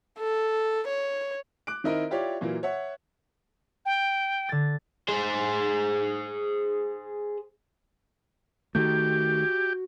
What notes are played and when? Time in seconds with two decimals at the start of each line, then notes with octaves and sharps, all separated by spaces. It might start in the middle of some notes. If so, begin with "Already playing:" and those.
0.20 A4
0.88 C#5
1.67 D6 F#6 D7
1.84 D#3 C4 D#4 E4 A#4 D#5
2.10 E4 F4 G4 C#5 D5
2.41 A#2 E3 F#3 A#3
2.63 C#5 E5 F#5
3.86 G5
4.49 D3 A6
5.09 G#4 C5
8.75 D#3 A3 F#4 G4